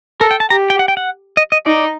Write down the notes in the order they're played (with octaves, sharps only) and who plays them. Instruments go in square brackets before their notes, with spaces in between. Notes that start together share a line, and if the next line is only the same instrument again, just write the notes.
[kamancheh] A4 [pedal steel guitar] A#4
[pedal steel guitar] G5
A5
[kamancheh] G4 [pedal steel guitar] A#5
[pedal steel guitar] G5
F#5
G5
F#5
D#5
D#5
[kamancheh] D#4 [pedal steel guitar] D5